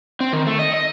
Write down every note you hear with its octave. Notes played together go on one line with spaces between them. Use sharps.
C4
D#3
A3
D#5
D#5